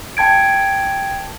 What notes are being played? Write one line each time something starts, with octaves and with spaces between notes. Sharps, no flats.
G5 A5 G#6 D7